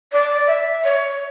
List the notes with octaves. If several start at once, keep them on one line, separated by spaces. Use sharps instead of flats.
D5
E5
C#5